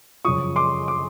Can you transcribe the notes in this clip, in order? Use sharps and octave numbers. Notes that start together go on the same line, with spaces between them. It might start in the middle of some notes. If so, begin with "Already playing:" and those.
F#2 C#3 F3 C#6 D#6
C6 D6
D6